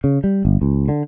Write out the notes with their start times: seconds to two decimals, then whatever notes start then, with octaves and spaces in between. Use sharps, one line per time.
0.04 C#3
0.24 G3
0.45 G1
0.62 C#2
0.88 D3